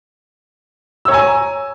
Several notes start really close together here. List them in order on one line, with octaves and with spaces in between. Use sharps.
E6 C#5 A#5 G#5